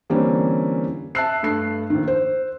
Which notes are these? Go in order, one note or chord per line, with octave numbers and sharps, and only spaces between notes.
D3 E3 G3 A#3 C4 C#4
E5 A5 E6 F#6 C7
G2 A3 C7
A#1 D#3
C5